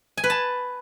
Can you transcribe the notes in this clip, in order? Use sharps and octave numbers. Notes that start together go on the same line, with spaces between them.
G#5
B4
A5